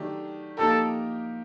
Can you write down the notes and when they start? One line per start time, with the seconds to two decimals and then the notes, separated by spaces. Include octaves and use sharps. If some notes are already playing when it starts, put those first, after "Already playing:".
Already playing: D#3 F#3 A3 D4 G4
0.57 F3 A#3 D#4 G4 A4 A#4